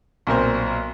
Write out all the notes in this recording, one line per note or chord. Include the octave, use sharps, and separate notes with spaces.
B1 A#2 C4 A#4 C5